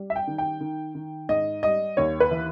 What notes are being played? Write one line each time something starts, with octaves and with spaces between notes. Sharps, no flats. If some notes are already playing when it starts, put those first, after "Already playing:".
Already playing: G3
E5
G5
D#3
G5
D#3
D#3
G#2 D#5
G3 D#5
D#2 C#5
B4
E3